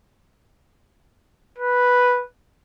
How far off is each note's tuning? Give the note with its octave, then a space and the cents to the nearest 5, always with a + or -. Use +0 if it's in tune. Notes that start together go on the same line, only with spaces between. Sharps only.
B4 -5